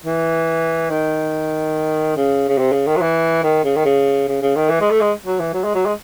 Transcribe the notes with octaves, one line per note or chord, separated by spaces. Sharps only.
E3
D#3
C#3
C#3
C3
C#3
D#3
F#3
E3
D#3
C#3
D#3
C#3
C#3
C#3
D#3
E3
G#3
A3
G#3
F#3
E3
F#3
G#3
F#3
G#3